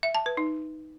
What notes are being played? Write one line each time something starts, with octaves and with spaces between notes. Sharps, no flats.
E5
A5
B4
D#4